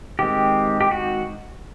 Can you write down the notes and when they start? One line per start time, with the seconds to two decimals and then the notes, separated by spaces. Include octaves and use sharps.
0.19 D#3 G#3 C4 G4
0.81 G4
0.91 F#4